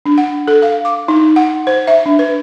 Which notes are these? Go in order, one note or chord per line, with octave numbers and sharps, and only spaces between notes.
D4
F#5
A4
F5
D6
D#4
F#5
C5
E5
D4
B4